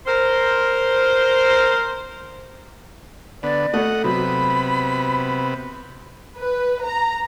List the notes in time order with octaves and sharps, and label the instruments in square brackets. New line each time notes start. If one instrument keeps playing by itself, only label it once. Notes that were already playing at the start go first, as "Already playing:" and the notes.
[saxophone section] A#4 C5
[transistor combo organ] D3 B3 [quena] D5
[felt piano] A3 [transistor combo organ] D#5 F#5
[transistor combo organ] C3 B3 [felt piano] F#3 [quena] B5
[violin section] B4
A#5